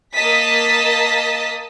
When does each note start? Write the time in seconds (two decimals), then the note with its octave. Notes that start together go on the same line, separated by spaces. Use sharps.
0.13 A#3 D#5 A5 D#6 B6